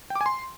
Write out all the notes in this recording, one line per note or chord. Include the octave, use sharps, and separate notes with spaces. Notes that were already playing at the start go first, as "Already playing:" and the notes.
G5
D6
G#5
C6